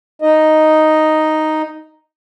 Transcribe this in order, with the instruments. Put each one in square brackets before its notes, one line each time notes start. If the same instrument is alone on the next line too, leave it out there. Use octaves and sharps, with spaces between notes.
[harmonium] D#4 D#5